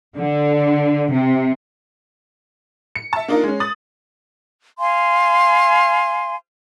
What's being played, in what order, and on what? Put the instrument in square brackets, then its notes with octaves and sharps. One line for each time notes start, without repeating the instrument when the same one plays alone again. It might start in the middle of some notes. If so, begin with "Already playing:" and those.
[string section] D3
C3
[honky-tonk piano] C#7
E5 A5
A#3 D4 D#4 F4 A#4
G#3 C#4
D#6 A6 F#7
[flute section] F5 G#5 C6